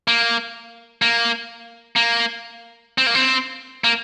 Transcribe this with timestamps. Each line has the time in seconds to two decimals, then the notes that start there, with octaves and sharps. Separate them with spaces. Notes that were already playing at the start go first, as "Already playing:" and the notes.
0.08 A#3
1.02 A#3
1.96 A#3
2.98 C4
3.07 A#3
3.15 C4
3.84 A#3